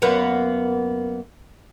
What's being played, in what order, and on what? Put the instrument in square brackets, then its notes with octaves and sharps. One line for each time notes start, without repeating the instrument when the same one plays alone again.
[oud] F#2 A#3 B3